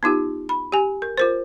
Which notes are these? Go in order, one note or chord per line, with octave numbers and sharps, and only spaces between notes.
B3 D#4 F4 G4
B5
G4 G#5
A#4
F4 A#4 C5